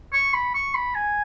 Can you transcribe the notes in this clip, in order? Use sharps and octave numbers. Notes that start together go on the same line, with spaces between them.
C#6
B5
C#6
B5
G#5